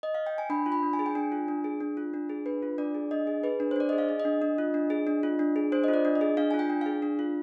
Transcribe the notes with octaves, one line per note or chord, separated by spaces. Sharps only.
D#5
F5
G5
G#5
D4 B5
F4
B5
D4
G#5
G#4
G5
D4 G#5
F4
D4
G#4
D4
F4
D4
G#4
D4 B4
F4
D4 D5
G#4
D4 D#5
G#4
G#4 B4
D4
C5
D4 D5
G#4 D#5
F5
G#4
D#5
D4
D4
F4
D4
G#4
D4
F4
D4
G#4
D4 C5
F4 D#5
D5
D4
D#5
G#4
D4 F5
G#5
F4
G5
D4
G#4 F5
D4
F4